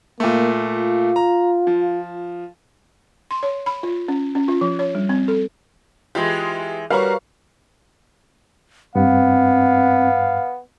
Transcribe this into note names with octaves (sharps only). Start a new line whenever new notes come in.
A#2 A3 A#3
F4
A#5
F3
C6
C#5
B5
F4
C#4
C#4
F4
F3
C#5
G3
C4
A4
E3 G#3 F4 G4 C6
G3 F#4 A#4 B4 C#5 F5 A#5 C#6
G2 B3 C4 F5